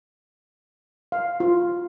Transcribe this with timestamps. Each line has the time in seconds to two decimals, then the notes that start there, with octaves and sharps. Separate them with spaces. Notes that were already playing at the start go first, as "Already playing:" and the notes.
1.12 F5
1.40 F4